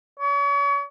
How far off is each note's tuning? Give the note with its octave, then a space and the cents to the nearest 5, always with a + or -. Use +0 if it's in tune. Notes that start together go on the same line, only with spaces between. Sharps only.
C#5 +40